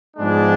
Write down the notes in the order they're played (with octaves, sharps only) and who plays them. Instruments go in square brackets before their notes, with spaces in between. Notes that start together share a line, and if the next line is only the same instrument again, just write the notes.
[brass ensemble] G#2 F3 G#3 B3 D4